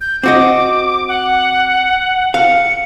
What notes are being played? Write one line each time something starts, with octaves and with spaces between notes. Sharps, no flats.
G6
C4 F#4 D#5 D6
F#5
F5 C#7